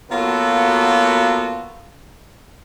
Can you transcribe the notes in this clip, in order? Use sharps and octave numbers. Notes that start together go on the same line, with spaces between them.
F#3 A#3 B3 F4 F#4 A4